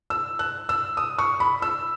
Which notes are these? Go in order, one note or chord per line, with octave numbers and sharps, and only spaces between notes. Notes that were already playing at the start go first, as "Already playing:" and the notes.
E6
F#6
E6
D#6
C#6
B5
E6